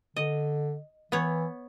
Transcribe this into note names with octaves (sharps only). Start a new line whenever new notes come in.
D3 D#5
E3 B3 C#5